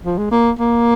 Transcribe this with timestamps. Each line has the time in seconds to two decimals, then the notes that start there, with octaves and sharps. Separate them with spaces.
0.05 F3
0.18 G#3
0.31 A#3
0.59 A#3